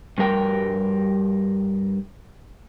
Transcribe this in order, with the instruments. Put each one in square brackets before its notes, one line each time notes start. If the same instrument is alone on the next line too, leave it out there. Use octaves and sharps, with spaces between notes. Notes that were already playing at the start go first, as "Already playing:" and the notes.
[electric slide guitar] G2 G3 A#4 G5